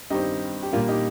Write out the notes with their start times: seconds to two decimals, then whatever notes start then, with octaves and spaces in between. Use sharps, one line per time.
0.10 G2 D#3 G3 C4 D#4 G4
0.63 G4
0.72 A#2 G3 A#3 D4 F4
0.88 D#4 G4